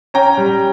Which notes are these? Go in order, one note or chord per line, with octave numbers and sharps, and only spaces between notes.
C#4 G5 A#5
G3